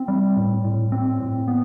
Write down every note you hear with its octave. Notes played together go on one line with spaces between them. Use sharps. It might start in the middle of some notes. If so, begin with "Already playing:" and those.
Already playing: C4
G3
A2
A2
C4
A2
B3